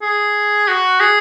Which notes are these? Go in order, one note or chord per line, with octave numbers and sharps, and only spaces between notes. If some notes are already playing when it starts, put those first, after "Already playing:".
G#4
F#4
G#4